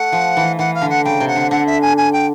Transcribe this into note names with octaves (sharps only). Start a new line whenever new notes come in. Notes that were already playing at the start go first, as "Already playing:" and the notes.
Already playing: A3 F#5
F3
E3
E3 F#5
F5
D3
F#5
C#3 G5
C3
F#5
D3
D3 F#5
E5
G#5
G#5
G5